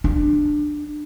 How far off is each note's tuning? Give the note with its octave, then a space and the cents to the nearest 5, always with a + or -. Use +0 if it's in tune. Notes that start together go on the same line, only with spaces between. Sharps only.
D4 +15